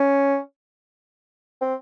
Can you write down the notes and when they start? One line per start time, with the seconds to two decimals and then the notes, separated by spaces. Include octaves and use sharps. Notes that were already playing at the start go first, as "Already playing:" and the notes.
Already playing: C#4
1.61 C4